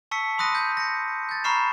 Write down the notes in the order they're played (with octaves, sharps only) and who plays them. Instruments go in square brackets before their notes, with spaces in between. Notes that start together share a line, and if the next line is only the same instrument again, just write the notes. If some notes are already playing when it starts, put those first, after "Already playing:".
[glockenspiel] A5 C#6 E6 B6 C#7
B5 C6 D#6 F#6 A#6 D#7
G6
A#6 C#7
G6 A6
A#5 B5 C#6 F6 C7 E7